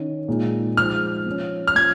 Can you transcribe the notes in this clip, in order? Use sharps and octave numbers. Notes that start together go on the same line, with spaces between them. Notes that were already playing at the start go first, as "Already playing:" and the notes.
Already playing: D#3 C#4
A#2 G#3 D#4
F3 G#3 D#4 F6
F3 C#4
F6
F3 C#4 G#6